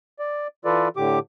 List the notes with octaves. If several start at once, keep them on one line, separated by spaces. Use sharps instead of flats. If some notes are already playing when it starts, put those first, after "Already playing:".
D5
E3 F4 A4 B4 D5
A2 D3 G4 D6